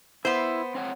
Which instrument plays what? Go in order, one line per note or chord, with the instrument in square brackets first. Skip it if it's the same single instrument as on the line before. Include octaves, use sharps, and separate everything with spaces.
[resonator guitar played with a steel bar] B3 C5 [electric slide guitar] E4
[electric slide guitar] C4 C#5 F#5